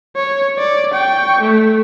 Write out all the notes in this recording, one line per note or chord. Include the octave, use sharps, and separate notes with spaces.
C#5
D5
G5 C#6
A3